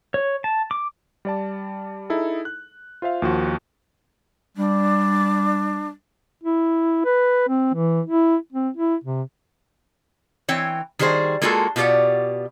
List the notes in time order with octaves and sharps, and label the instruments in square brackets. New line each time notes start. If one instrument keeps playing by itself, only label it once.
[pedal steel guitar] C#5
A5
D6
[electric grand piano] G3 D5 A5
D#4 E4 G#4 A4
F#6
F4 C5 E5 F5
D#2 F3 F#4
[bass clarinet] G3 [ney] D4
[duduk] E4
B4
C4
E3
E4
C4
E4
C3
[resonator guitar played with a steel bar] E3 C4 C#5 G5
D#3 G3 F#4 G#4 C5
G#3 A#3 F4 F#4 G#4 A4
B2 F4 G4 G#4 D5 F#5